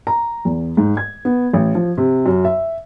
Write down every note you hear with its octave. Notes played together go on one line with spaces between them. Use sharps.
A#5
E2
G#2
G#6
B3
A1
F3
C3
F#2
E5